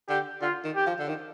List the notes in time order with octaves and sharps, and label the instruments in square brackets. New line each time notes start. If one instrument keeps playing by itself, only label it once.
[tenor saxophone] D3 [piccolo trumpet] G4
[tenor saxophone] D3 [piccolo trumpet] F4
[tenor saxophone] D#3
[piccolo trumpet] G4
[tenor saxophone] F3
D3
D#3